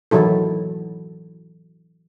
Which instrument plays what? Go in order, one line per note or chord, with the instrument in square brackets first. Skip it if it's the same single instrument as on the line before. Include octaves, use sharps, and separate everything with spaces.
[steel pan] D#3 E3 F#3 E4 A4